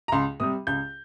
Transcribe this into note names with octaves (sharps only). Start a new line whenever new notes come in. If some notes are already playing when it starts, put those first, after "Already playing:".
A#5
C#2 C6
C3 G3 D#6
C#2 G6